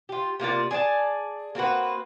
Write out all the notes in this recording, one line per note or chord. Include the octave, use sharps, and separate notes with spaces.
F4 G4
C3 A#3 F4 D5
G#4 D5 G#5 A5
A#3 C4 F#4 B4